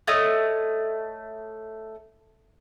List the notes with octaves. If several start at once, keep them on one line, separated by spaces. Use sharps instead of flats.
A3 C#5 D#5 F6